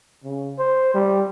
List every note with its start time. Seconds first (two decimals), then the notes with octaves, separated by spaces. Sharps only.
0.24 C#3
0.58 C5
0.94 G3